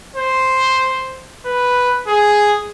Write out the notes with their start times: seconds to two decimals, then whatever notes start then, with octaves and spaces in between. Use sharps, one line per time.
0.16 C5
1.46 B4
2.07 G#4